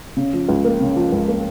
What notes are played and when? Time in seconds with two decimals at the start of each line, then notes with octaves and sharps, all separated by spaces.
0.17 C#3
0.33 F3
0.49 C#2
0.64 A#3
0.81 C#3
0.96 F3
1.12 C#2
1.28 A#3